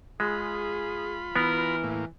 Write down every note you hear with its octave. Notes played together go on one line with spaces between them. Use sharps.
G#3 F4 G#4 B5
E3 B3 A#4
A2 A#3